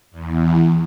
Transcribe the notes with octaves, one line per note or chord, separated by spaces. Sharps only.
E2